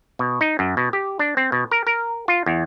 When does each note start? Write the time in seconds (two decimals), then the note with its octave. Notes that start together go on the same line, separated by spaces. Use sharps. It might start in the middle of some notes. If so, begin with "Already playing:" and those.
0.19 B2
0.41 D#4
0.59 F#2
0.77 B2
0.93 G4
1.19 D4
1.37 C4
1.52 B2
1.71 A#4
1.87 A#4
2.28 F4
2.46 E2